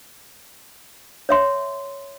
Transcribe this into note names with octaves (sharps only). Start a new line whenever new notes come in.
C#5 E5 C6